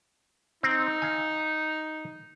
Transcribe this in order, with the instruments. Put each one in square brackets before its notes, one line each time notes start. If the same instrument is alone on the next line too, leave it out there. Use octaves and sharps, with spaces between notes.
[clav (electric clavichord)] C4 [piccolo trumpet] D#4
[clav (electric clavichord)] F5 G#5